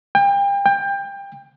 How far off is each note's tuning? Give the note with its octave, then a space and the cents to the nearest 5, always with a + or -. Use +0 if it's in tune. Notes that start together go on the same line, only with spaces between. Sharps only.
G5 +35
G5 +25